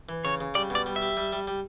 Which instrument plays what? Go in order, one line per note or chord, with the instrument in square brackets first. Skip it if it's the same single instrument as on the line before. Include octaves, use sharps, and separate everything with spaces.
[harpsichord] E3
[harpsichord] C#3 [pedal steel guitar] C#5
[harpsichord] C#3
[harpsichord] G3 [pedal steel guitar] D5
[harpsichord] B2 [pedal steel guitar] D5
[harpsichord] G3
[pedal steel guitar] E5
[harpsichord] G4
G3
G3
G3